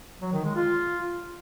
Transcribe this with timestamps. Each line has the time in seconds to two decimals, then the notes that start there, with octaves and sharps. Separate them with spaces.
0.22 F#3
0.33 D#3
0.44 G#3
0.56 F4